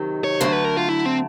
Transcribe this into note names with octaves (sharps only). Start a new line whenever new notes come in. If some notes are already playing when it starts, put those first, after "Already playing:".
Already playing: C3 D#3 F#3 D#4
C#5
D3 F#3 A3 C5
B4
A#4
F4
E4
C4